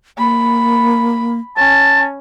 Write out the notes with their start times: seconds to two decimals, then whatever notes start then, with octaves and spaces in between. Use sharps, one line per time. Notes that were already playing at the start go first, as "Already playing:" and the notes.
0.18 A#3 B5
1.57 C#4 A5